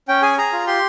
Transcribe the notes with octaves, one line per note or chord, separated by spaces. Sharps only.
C#4 G5
G#4 G#5
G#4 A#5
F4
G4 C6